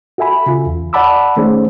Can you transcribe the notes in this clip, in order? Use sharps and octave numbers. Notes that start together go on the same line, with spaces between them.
F#4 A4 E5 G#5 B5
C#3 F4
E2
D5 F#5 A5 B5 D6 E6
D#3 A3 C#4 G#4 C5